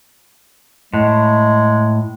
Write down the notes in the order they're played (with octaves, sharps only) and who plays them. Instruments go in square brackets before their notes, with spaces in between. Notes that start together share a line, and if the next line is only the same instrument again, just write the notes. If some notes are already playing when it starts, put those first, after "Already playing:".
[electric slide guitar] A2 [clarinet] G#3